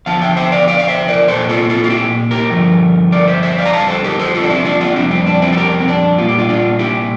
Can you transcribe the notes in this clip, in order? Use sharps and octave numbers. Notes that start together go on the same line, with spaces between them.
E2 D3 F3 F5 A5
E5 G5
C5 E5
D5 F5
D5 F5
F5
C5 E5
A#4 D5
A#2 A3 A4 C5
F4 A4
F4 A4
F4
E4 G4
G4 A#4
G2 D3 F3 A3
A#4 D5
C5 E5
C5 E5
D5 F5
A#5
F2 D3 G3 F5 A5
A4 C5
G4 A#4
A4 C5
F4 A4
D4
C4 E4
D4 F4
D4 F4
F2 D3 G3 C4 E4
C4
D4
C4 E4
A4
G4 A#4
C4
D4
A#2 G3 A#3 F4
G4
D4 F4
D4 F4
E4 G4